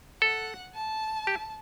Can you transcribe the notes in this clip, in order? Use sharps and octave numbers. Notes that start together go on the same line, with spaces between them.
A4 F#5
A5
G4